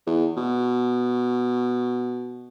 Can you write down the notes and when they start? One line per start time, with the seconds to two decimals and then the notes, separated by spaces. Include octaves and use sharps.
0.06 E2
0.36 B2